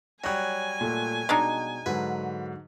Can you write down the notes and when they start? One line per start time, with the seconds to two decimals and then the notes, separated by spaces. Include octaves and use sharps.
0.24 F#3 G3 C#5 G#5 F#6
0.81 A#2 A3
1.29 B2 G#3 D4 D#4
1.86 G#2 D3 F#3 B4